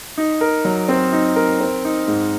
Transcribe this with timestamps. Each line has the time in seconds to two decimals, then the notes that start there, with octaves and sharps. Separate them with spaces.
0.18 D#4
0.41 A#4
0.65 F#3
0.89 C4
1.13 D#4
1.36 A#4
1.60 C4
1.85 D#4
2.07 G#2